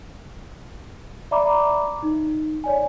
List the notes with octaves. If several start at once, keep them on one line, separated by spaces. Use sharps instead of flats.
D5 E5 A#5 B5 D6
D#4
C#5 D5 G#5